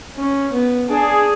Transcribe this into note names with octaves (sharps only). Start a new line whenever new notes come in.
C#4
B3
D4 G#4